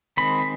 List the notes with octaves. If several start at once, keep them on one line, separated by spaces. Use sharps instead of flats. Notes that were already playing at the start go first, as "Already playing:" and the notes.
D#3 G#3 C4 B5